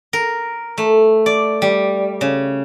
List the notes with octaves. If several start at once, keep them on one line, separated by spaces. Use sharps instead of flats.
A#4
A3
D5
G3
C#3